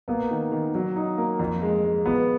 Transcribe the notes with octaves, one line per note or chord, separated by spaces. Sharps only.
A#3 B3
D#3
D#3
F#3
D#4
A#3
F2
G#3
G#3
F3 B3